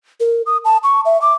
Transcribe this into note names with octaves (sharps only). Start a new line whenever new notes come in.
A#4
D#6
A5
C#6
E5
D6